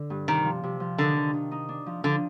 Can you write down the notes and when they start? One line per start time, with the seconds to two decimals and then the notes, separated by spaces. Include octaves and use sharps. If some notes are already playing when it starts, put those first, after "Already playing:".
Already playing: D3
0.10 G2
0.28 C3 D#3
0.45 F3
0.63 C3
0.80 F3
0.98 D3 D#3
1.16 D#3
1.33 D#3
1.51 D#4
1.69 D4
1.86 F3
2.04 D3 F3